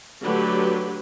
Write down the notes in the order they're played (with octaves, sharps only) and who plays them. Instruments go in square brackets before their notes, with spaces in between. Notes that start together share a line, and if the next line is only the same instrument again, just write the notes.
[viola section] D3 F#3 A3 G4 B4